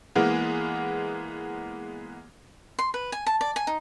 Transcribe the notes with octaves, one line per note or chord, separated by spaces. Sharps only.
E3 G#3 A#3 B3
C6
B4
G#5
A5
D5
G#5
D#4